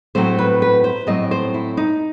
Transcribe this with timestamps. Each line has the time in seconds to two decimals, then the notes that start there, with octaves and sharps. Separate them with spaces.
0.15 A2 F#3 A3 C4 C5
0.38 B4
0.62 B4
0.84 C5
1.07 A2 F#3 A3 C4 D#5
1.31 C5
1.54 E4
1.77 D#4